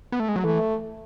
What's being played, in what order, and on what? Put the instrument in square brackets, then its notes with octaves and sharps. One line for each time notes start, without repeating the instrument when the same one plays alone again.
[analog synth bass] B3
A3
G#3
F#3
[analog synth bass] E3 [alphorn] A3